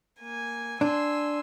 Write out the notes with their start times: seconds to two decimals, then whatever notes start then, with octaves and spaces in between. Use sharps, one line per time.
0.20 A#3 G#5
0.81 D4 G#5 C6 E6